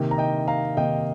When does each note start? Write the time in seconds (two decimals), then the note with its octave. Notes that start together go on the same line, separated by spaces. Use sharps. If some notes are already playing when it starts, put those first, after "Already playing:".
Already playing: C3 D#3 A#3
0.11 A#5
0.18 D#5 G5
0.48 F5 A#5
0.77 C3 D#3 A#3 D#5 G5